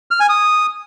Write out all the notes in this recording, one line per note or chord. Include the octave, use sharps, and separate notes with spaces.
F6
G#5
D#6